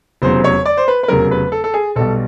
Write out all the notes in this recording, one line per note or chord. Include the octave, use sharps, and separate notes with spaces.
F1 E2 C#3 F#3 C5
C#5
D5
C5
B4
B4
F1 E2 C#3 F#3 A#4
B4
A4
A4
G#4
B1 B2 G3 A4